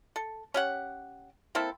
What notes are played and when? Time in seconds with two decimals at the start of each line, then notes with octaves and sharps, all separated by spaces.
0.16 A4
0.54 C#4 G4 F#5
1.55 A#3 C4 E4 A4